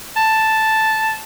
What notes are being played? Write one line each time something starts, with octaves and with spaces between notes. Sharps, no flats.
A5